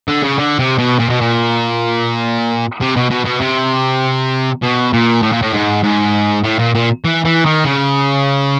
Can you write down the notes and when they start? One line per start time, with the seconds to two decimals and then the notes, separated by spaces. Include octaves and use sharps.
0.08 D3
0.23 C#3
0.38 D3
0.59 C3
0.78 B2
0.99 A#2
1.10 B2
1.21 A#2
2.81 C3
2.96 B2
3.11 B2
3.26 B2
3.41 C3
4.63 B2
4.93 A#2
5.22 A2
5.33 A#2
5.42 A2
5.53 G#2
5.84 G#2
6.44 A2
6.59 A#2
6.75 A#2
7.05 E3
7.25 E3
7.46 D#3
7.65 C#3